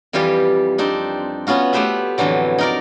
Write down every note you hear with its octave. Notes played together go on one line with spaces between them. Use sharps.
F2 E3 G3 F4 G4
C4 D4 D#4
B3 C#4 F4 F#4
A3 B3 G4 B4 C5 E5
F2 A2 D3 E3 F#3
D#4 A#4 D5